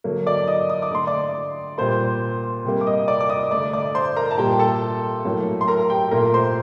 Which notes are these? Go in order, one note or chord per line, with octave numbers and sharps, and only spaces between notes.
D3 F#3 A#3
D5 D6
D#5 D#6
D#6
D6
D3 A3 C6
D5 D6
A#2 G3 A#3 C5 C6
C3 G3 A#3
D6
D#5 D#6
D5 D6
D6
D#5 D#6
D3 A3 D5 D6
D5 D6
C5 C6
A#4 A#5
A5
A#2 G3 A#3 G4 G5
G5
A4 A5
A2 F#3 A#3
C6
A#4 A#5
G4 G5
A#2 A3 A#4 A#5
C5 C6